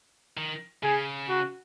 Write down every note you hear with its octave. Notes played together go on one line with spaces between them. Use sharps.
D#3
C#3 G#4
F#4